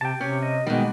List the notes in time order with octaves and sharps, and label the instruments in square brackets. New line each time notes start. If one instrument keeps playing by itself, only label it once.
[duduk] C3 [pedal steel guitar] G5 A5
[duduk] C3 [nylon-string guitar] C#4 [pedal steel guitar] G4 C#5
[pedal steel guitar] D#5
[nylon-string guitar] B2 D#3 [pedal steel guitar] G3 A#3 F#4 [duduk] G#3